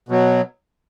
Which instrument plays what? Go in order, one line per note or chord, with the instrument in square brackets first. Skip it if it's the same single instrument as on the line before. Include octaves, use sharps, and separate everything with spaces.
[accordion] B2 F#3